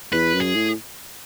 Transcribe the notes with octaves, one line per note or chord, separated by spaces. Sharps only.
E2 B4
F#2
G#4
A2